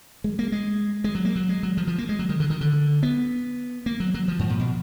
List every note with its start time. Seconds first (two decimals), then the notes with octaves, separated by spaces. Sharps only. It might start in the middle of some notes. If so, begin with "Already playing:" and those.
0.24 G#3
0.39 A#3
0.52 G#3
1.04 G#3
1.15 F#3
1.25 A#3
1.36 F#3
1.49 G#3
1.63 F#3
1.77 F3
1.87 F3
1.98 A#3
2.09 G#3
2.19 F#3
2.29 D#3
2.40 D3
2.50 D#3
2.61 D3
3.03 B3
3.86 A#3
4.00 F#3
4.14 F#3
4.28 F3
4.39 G#2
4.49 A#2
4.59 B2